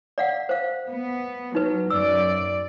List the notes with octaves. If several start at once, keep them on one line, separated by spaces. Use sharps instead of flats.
D5 F5 F#5
C5 F5
B3
F#3 D#4 B4
F#2 D5 E6